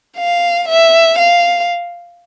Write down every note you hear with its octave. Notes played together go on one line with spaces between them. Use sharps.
F5
E5
F5